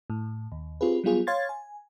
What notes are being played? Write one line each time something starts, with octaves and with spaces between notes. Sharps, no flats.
A2
D#2
C4 F4 G4 G#4 B4
F#3 G3 B3 F4 G#4
C#5 F5 C6 G#6 A6
G#5